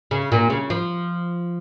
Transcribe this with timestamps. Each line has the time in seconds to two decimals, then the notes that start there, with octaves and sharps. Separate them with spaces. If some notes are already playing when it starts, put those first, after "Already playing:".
0.11 C#3
0.32 A#2
0.50 C#3
0.70 F3